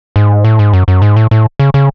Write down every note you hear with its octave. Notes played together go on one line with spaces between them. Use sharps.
G#2
A2
G#2
F#2
F#2
G#2
A2
A2
C#3
C#3